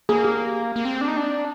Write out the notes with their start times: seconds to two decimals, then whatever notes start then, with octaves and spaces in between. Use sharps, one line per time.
0.09 A#3 G#4
0.24 G4
0.76 A#3
0.85 C4
1.01 D4
1.08 D#4
1.17 D4